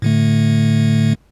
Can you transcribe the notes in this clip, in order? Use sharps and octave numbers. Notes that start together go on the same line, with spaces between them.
A2 D3 A3